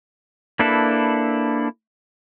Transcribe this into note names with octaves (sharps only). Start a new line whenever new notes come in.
A#3 D4 E4 A4 B4